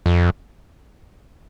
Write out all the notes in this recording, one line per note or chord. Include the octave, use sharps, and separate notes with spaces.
F2